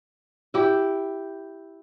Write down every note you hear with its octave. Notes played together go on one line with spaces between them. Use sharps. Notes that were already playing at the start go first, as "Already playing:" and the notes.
E4 G4